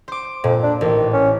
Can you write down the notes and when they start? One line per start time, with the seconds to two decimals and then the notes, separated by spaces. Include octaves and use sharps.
0.08 C5 D6
0.44 F2 A#2
0.63 D4
0.81 A1 D#3
1.13 C#4